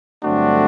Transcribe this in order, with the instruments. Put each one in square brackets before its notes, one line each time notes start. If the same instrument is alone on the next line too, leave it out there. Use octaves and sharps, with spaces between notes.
[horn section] G2 D3 F#3 A3 C4 D4 F#4